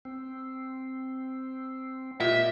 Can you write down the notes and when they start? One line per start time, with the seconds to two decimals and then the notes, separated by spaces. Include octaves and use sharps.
0.05 C4
2.20 A#2 G4 D#5 E5